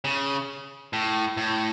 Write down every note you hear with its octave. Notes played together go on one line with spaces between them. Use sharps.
C#3
A2
A2